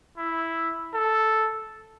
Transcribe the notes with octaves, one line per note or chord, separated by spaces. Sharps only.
E4
A4